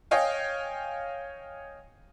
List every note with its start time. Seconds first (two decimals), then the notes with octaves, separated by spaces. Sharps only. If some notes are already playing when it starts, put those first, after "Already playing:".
0.11 C#5 D#5 F5 G5 G#5